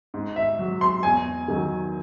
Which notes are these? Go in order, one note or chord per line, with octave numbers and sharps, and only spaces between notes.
G#2
E5
F#3
C6
E2 G#5
D#3 F#3